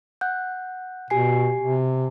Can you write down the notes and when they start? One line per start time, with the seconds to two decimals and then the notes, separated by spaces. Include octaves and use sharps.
0.21 F#5 F#6 G6
1.10 B2 G4 G#5 C7
1.61 C3